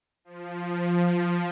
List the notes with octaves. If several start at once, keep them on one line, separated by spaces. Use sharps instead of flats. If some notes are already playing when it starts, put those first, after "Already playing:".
F3